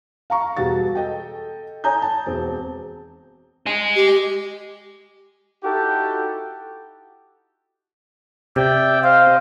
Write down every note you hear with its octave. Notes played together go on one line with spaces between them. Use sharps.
F5 A#5 C#6
E1 B2 G3 F#4 A6
A4 D#5 G5
C#5 G#5 A#5 D#6 G6
A5
E1 C4
D#5 G#5
G4
D#4 E4 F#4 G4 A4 G5
C3 D5 E5 G5
C5 D#5 F5